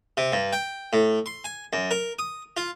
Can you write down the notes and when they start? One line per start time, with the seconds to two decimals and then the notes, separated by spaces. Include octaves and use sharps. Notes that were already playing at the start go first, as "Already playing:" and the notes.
0.17 C3
0.33 G2
0.53 G5
0.93 A2
1.26 C6
1.44 G#5
1.73 F#2
1.91 A#4
2.19 D#6
2.57 F4